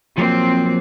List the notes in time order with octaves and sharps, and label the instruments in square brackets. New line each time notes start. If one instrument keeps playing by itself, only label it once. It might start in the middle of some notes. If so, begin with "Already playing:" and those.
[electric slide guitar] F3 F#3 A#3 [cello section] C4